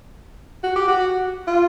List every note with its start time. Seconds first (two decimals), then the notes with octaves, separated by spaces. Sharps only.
0.64 F#4
0.76 G4
0.88 F#4
1.47 F4